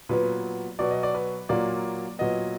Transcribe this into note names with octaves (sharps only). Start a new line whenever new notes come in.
A#2 F#3 B3 B4
B2 F#3 B3 D5
D#5
D5
B4
A#2 F#3 A#3 D5
A#2 F#3 B3 D#5